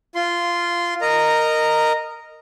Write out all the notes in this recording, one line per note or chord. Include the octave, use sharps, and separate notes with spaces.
F4 C6
A#4 D#5 A#5